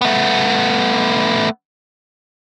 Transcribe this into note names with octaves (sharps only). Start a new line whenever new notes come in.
A3 B3